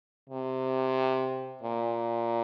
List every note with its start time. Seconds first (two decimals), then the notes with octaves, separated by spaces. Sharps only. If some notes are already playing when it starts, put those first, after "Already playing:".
0.29 C3
1.63 A#2